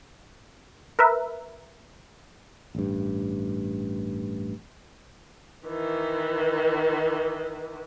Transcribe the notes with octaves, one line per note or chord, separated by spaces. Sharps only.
A#4 B4 E5
A1 G2
D#3 E3